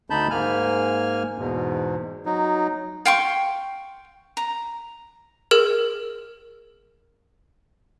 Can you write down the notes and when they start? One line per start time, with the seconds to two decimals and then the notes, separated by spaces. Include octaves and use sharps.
0.10 D2 D3 D#4 A5 B5 G6
0.30 G#2 A#3 G#5 F6
1.38 E2 G#2 B2
2.26 F#3 D#4
3.05 F5 G5 C6 C#6
4.37 A#5
5.51 G#4 A#4 F6